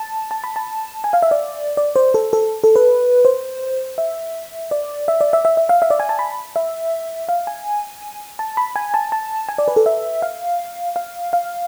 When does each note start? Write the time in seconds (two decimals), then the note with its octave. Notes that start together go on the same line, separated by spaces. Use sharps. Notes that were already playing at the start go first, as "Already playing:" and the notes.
Already playing: A5
0.31 A5
0.44 B5
0.56 A5
1.04 G#5
1.13 F5
1.22 E5
1.31 D5
1.77 D5
1.96 C5
2.14 A4
2.33 A4
2.64 A4
2.76 B4
3.25 C5
3.98 E5
4.71 D5
5.08 E5
5.21 D5
5.33 E5
5.45 E5
5.57 E5
5.69 F5
5.82 E5
5.90 D5
6.00 G#5
6.09 A5
6.19 B5
6.56 E5
7.29 F5
7.47 G#5
8.39 A5
8.57 B5
8.76 G#5
8.94 A5
9.12 A5
9.49 G#5
9.58 D5
9.68 B4
9.76 A4
9.86 E5
10.22 F5
10.96 F5
11.33 F5